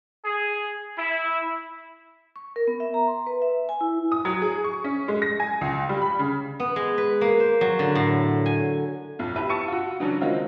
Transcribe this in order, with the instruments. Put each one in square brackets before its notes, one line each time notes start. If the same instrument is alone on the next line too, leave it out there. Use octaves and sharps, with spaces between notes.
[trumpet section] G#4
E4
[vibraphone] C#6
A#4
B3
E5
A#5
C6
B4
E5
G#5
E4
[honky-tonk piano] D#6
F#3
G#4
C#6
C#4
G#3
A#6
G#5
C#2
G3
B5
C#3
[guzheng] B3
G#3
B4
A#3
C5
F#3
D3
A2
G#5
[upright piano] B1 F2
E4 G4 B4 E5
A5 C#6 E6 C#7 D#7
F4 F#4
C#3 E3 F#3 C#4 D4
D#3 F#3 G#3 C4 F4